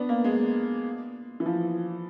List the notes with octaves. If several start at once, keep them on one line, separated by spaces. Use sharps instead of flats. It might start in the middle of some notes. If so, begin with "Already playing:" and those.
Already playing: B3 D4
A#3
G#3
E3
F3